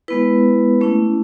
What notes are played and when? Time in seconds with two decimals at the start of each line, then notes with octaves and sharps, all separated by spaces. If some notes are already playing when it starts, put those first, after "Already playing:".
0.08 G#3 B3 E4 B4
0.81 A3 C#4 E4